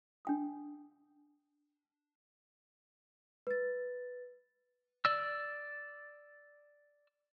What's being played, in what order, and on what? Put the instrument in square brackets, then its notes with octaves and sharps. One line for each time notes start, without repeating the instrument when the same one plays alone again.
[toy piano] D4 G5 D#6
[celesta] B4 A6
[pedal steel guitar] D5 E6